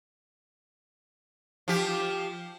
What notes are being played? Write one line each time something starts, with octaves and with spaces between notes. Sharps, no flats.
F3 G4